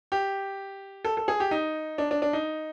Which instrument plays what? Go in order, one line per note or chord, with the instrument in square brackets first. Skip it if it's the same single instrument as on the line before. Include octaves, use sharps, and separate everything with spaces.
[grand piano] G4
A4
A4
G#4
G4
D#4
D4
D4
D4
D#4